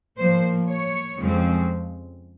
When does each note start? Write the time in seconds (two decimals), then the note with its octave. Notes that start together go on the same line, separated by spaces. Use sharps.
0.17 A#2 F3 A#3 C5
0.68 C#5
1.18 F2 C#3 F3 G#3 C4